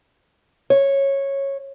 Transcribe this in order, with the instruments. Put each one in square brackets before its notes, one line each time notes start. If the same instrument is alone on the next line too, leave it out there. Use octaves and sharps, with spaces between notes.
[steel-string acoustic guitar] C#5